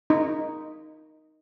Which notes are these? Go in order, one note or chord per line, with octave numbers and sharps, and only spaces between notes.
D#4